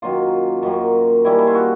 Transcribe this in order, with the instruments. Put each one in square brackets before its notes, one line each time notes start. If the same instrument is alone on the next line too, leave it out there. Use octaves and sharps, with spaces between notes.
[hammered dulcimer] F#2 D#3 F#3 A#3 F4
F#2 D#3 F#3 A#3
D#3 G3 A#3 C#4 E4
E4
F4
F#4